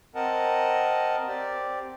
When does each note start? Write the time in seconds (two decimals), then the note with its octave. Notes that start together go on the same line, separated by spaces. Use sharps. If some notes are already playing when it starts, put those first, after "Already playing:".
0.15 C4 A#4 D#5 F#5 A5
1.27 C4 G4 D5